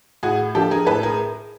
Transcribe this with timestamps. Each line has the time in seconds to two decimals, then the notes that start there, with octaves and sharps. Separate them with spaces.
0.23 A2 F#4 G#4
0.55 F3 A#3 D4 G4 A4
0.71 G#4 A#4
0.86 A2 A4 B4
1.03 G#4 A#4